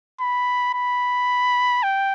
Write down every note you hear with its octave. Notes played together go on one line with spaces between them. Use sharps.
B5
B5
G5